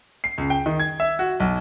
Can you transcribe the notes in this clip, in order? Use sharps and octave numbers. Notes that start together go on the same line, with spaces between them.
C7
C#2
G5
D#3
G#6
E5
F#4
B1